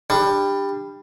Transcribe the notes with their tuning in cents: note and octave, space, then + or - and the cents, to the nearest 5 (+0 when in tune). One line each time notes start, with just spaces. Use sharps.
G3 +15 D4 +20